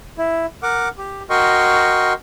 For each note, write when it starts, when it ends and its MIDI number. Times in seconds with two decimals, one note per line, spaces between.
0.18 0.46 64
0.63 0.89 70
0.63 0.89 78
0.63 0.89 86
0.98 1.23 67
1.30 2.13 66
1.30 2.13 70
1.30 2.13 75
1.30 2.13 79
1.30 2.13 84
1.30 2.13 85